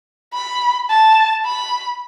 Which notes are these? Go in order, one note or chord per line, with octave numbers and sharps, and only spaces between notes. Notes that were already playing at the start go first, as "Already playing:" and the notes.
B5
A5
B5